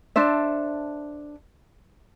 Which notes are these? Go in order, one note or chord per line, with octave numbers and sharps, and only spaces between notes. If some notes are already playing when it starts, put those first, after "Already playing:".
D4 A4 C5 E5